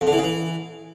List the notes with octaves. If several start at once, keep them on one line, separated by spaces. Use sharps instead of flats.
F2
D3
E3
C#3
E3